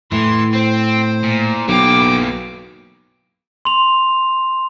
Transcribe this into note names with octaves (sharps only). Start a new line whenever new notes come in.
A2 E3 C6
C4 C5
A#2
B1 E3 A#3 G5 D6
C6 F7